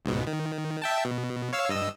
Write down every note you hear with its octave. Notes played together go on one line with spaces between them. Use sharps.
C#2 G#2 B2
D#3
E5 G5 A5
B2
C#5 F5 E6
G2 D#5 E6